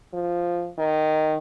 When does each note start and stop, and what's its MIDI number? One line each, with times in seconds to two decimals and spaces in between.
0.13 0.69 53
0.79 1.37 51